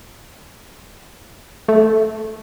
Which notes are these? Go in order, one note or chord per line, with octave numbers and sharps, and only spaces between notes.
A3